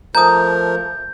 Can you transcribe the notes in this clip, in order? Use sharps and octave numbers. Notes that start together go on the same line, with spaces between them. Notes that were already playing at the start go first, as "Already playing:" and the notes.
F3 A3 A#4 A#5 D#6 G6